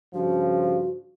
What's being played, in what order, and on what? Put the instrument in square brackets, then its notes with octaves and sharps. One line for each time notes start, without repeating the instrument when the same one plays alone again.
[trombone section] G2 C#3 F3 [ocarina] F#4